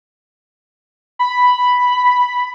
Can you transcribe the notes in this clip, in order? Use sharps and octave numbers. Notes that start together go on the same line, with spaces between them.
B5